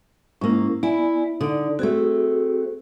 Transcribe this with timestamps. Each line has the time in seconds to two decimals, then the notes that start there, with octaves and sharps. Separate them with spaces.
0.41 G#2 A#3 C#4 E4
0.83 B3 E4 D5 G#5
1.41 D3 D#4 D5
1.79 A3 C4 F#4 G#4